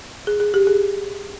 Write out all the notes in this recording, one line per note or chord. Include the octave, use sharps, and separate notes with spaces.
G#4
G#4
G4
G#4